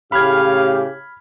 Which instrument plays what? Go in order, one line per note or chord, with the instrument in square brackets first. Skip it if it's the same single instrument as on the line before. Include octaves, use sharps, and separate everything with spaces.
[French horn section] A2 C#3 [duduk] G4 [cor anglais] F5 [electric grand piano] B5 F6 G#6